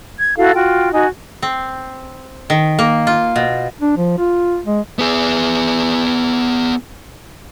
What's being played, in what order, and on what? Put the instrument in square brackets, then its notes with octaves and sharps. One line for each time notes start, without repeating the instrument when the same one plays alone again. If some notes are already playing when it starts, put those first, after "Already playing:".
[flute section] G#6
E4 F#4 A4 F5
F4 F#4 G5
D#4 F#4 G#5
[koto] C4
D#3
A#3
F4
B2
[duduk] D4
F3
F4
G#3
[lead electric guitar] B3 G#4